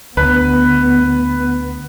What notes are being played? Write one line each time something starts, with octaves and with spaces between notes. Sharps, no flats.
D2 B3 B4